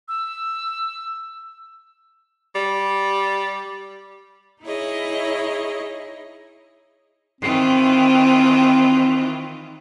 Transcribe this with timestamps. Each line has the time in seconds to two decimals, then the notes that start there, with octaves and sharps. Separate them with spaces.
0.08 E6
2.55 G3
4.63 D#4 E4 G#4 C#5 D#5
7.41 D#3 E3 C4 F4